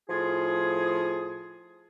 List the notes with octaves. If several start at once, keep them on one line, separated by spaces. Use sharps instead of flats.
A2 F3 F4 G#4